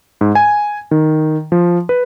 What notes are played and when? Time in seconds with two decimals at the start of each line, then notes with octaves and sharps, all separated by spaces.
0.21 G#2
0.35 G#5
0.91 D#3
1.52 F3
1.89 B4